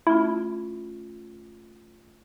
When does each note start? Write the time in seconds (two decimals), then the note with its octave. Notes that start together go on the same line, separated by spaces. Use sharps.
0.07 A3 C#4 E4 F4